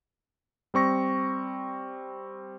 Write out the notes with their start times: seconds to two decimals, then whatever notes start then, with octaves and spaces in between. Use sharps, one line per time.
0.74 G3 C4 C#6 A#6